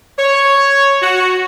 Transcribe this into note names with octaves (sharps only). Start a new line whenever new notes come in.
C#5
F#4